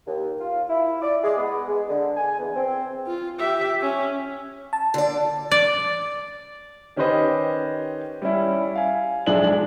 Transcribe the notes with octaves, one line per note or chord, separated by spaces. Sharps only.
D#2
F4
E4
D5
G#3
B3
G#3
D3
G#5
E2
C4
F4
G4 E5
C#4
A5
D3 D5
D5
D#3 C#4 G4 B4 C5 D#5
G3 C#4 E4
F5 G#5
B1 F3 G#3 D4 E5 F#7